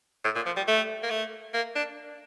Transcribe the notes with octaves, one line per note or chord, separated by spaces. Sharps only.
A2
A#2
F3
G3
A3
A#3
A3
A#3
D4